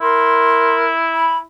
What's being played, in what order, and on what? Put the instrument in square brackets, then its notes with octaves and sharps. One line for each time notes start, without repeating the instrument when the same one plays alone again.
[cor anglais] E4 [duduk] A#4 [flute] C6
[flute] B5